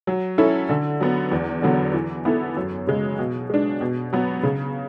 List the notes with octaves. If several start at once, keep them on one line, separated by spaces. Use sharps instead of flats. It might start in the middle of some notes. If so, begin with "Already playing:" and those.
F#3
C#4 E4 A4
D3
F#3 B3
E2
D3 F#3 B3
E3
B3 E4 A4
F#2
C#3 G#3
B2
G#3 D4
B2
F#3 B3
C#3